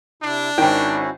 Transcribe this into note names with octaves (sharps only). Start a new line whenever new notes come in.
C3 D4 E4
G#1 D#3 C#4 E4 F#4 G5